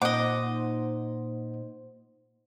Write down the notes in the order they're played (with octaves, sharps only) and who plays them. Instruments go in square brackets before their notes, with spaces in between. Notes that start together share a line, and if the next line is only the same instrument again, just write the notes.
[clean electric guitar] A#2 [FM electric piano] D#4 C5 [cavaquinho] D#5 D6 [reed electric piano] F#5